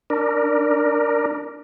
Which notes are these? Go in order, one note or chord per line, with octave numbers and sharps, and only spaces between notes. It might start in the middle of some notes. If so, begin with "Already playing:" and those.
D4 A#4